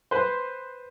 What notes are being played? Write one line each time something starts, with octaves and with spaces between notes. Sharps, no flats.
B4 C5